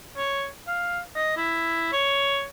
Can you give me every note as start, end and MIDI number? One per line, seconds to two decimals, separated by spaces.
0.17 0.48 73
0.67 1.00 77
1.16 1.32 75
1.37 1.91 64
1.92 2.45 73